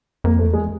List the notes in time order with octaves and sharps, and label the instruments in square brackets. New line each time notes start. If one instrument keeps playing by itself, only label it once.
[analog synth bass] F2 [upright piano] A#3
[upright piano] A3
[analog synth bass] E2
[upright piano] G#3